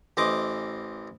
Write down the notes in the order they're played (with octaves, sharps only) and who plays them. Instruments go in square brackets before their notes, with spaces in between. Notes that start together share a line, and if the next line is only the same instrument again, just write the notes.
[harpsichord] A1 E3 C5 D#5 D6